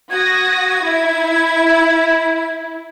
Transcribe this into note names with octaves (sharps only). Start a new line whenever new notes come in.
F#4 D#6 G#6 A#6
E4